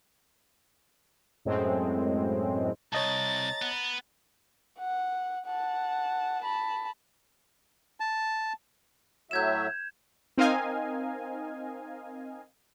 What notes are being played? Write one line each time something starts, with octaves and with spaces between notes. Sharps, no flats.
F#2 A2 G#3 C4
C2 C#5 D#5 A5 A#5 A6
B3
F#5
F#5 A5
A5 B5
A5
A2 F#3 E5 G6 G#6 E7
C4 D#4 A#4 D#5 F5 G#5